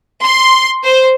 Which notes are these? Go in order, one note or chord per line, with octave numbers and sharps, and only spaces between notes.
C6
C5